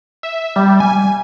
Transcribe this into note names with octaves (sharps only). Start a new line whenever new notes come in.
E5
G3
G#5